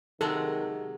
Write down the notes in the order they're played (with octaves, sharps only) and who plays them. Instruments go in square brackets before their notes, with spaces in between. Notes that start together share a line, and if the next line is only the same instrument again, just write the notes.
[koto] C3 F#3 G#3 [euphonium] D#3 [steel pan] A4